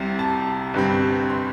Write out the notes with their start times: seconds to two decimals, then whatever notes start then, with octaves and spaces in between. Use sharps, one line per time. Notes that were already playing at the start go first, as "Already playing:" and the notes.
Already playing: C2 C3 G3 C4
0.19 A5
0.74 G1 G2 G3 C4
1.30 C6